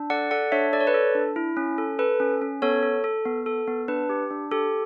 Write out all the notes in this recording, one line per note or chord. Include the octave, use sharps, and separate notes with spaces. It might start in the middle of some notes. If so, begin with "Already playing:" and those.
Already playing: D4
A4 D5 F#5
A4 D5 F#5
D4 C#5 E5
A4 D5
C#5
B4 D5
A4
D4
E4
C#4
A4
A4 B4
C#4
C#4
B3 A4 C#5
A4
A4
B3
A4
B3
D4 B4
G4
D4
G4 A4